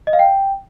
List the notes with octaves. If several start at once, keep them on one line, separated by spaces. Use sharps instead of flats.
D#5
F5
G5